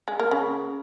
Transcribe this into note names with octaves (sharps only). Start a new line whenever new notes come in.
G#3
A#3
C#3